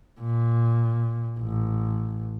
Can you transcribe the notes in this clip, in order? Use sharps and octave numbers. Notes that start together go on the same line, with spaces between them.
A#2
A1